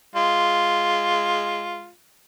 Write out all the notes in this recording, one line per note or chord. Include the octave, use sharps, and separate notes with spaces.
G#3 F4